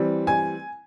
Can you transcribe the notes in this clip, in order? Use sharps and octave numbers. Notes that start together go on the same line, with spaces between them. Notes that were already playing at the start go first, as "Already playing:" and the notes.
Already playing: E3 G3 C4
G#5